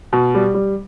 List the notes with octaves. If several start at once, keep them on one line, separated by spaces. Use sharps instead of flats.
B2
G3
G3